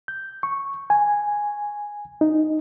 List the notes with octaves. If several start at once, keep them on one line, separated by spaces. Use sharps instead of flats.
G6
C#6
G#5
D#4